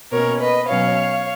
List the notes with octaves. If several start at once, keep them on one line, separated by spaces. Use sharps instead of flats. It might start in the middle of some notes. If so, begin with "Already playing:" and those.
B2 A#3 C#4 A#4 C#5
B4 D#5
B2 F#3 C#4 C#5 F5